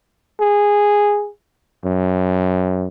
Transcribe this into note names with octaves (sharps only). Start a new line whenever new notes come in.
G#4
F#2